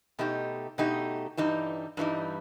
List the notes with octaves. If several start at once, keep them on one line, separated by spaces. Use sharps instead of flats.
B2 A3 D#4 G4
B2 A3 D#4 G4
G2 E3 G3 D#4
G2 E3 G3 D#4